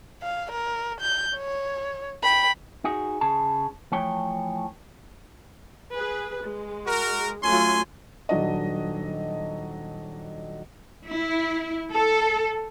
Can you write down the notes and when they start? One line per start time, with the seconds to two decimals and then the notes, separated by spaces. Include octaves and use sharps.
0.22 F5
0.51 A#4
1.00 G6
1.36 C#5
2.24 G5 B5
2.84 D#4 F#4 G#4
3.21 C#3 G#4 A5
3.92 E3 F3 A3 C#5 G5
5.92 G#4 B4
6.43 G#3
6.86 F#4 A#4
7.43 F#3 A3 C#4 F4 G#5 C6
8.29 D#1 F#3 D4 D#5
11.09 E4
11.91 A4